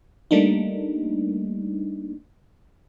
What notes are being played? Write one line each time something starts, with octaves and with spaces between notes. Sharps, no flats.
G3 A3 A#3 D4 D#4